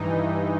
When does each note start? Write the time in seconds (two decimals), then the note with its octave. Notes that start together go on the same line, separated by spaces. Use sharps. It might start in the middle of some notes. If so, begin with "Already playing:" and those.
Already playing: G2 E3 D#4